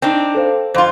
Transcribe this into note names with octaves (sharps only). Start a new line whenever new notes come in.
C4 D4 D#4
A4 C5 F5
F2 F4 C5 C6